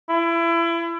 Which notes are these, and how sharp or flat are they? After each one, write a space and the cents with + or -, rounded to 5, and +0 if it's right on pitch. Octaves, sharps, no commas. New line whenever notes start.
E4 +30